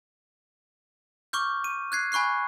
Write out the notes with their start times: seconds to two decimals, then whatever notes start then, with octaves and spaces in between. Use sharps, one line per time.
1.33 C#6 D6 F6 G6
1.64 D#7
1.92 F#6 G#6 C7
2.12 G#5 B5 C#6 F#6 C7